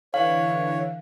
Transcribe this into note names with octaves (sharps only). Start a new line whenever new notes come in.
D3 E3 C#5 F5